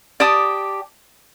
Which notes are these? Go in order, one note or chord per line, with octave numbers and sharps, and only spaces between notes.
G4 D5 A5 D#6